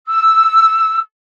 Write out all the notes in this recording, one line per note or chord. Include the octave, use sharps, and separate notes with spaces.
E6